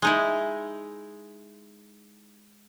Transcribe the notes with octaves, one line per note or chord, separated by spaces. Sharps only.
G#3 D#4 E4